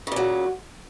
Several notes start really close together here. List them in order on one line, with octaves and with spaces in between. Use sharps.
C#3 A#2 F#3